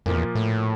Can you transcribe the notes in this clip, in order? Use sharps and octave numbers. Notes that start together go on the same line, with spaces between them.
F2 A#2 F3 A#3
E2
A2